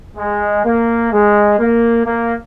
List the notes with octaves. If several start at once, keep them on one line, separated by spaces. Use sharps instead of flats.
G#3
A#3
G#3
A#3
A#3